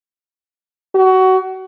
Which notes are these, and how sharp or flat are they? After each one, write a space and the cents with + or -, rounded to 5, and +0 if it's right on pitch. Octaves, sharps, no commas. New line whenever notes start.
F#4 +25